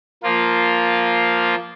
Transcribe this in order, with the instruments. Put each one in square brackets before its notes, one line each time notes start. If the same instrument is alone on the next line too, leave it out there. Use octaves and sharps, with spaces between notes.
[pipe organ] F3 A#3 F4